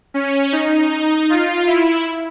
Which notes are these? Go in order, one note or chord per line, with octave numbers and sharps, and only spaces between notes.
C#4
D#4
F4
E4